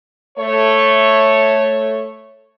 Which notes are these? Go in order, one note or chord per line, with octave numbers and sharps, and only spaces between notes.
A3 C#5